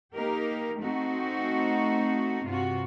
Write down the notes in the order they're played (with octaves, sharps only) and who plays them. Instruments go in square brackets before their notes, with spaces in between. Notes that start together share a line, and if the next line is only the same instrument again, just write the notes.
[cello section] A#3 D#4 G4 A#4
A3 C4 D#4 F#4
G2 C3 F4 F#4